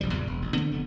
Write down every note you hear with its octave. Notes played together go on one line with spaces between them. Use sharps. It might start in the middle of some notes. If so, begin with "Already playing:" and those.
F1 A#1 C3 G3
E2 A#2 C#3 G3
E1
A1
D3 A3 B3 C4
F1 D3 B3